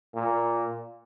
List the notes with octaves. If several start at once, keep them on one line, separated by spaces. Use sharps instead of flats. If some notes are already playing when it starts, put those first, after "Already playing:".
A#2